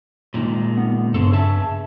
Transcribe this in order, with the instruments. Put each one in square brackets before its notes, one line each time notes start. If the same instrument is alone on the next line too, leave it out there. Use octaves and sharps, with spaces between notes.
[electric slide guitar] A#2 D#3 G#3
[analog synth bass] B3
[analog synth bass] G2 [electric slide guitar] C#3 C4 A4
[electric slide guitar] G#4 E5 A5